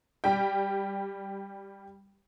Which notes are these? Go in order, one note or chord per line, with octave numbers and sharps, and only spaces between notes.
G3 G4 G5